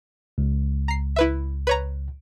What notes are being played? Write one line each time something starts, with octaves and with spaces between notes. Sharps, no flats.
C#2
A#5 C7
E4 B4 E5
B4 C#5 A#5